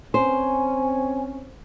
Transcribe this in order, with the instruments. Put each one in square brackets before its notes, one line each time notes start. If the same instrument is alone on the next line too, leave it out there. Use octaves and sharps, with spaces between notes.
[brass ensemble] C4 C#4 [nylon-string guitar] C5 [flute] G#5